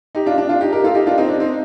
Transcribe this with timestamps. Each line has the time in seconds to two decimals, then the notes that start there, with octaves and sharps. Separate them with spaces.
0.15 D#4 G4
0.26 D4 F4
0.38 D4
0.49 D4 F4
0.61 D#4 G4
0.72 G4 A#4
0.84 F4 A4
0.95 D#4 G4
1.07 D4 F4
1.18 C4 D#4
1.29 D4
1.40 C4 D#4